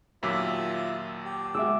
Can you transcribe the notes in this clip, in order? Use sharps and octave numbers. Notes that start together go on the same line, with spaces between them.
D#2 A#2 F#3 F4 E5 D6 E6 B6
G4
G#3 F#4 E5 D6 E6